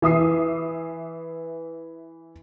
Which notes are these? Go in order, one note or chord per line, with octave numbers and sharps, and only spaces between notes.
E3 E5 D#6 C7